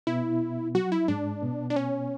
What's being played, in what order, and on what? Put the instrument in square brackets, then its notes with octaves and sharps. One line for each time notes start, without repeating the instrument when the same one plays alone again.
[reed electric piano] B2 B3 [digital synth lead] E4
[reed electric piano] F#3 [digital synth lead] F#4
[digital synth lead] E4
[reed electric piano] G#2 G#3 [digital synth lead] D4
[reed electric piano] B2 B3
[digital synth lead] D4
C#4